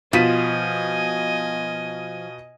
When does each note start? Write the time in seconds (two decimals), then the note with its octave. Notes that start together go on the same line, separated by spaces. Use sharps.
0.13 B2 F3 F4 D#5 G#5 B6 D#7